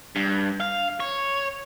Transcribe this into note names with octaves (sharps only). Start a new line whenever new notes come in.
G2
F5
C#5